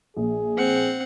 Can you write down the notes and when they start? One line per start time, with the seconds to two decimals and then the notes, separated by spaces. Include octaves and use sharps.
0.17 A#1 G#4
0.57 C4 F#5